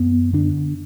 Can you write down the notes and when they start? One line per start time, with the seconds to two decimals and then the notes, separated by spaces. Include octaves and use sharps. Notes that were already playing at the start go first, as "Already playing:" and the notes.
Already playing: F#2 B3
0.33 D3 D4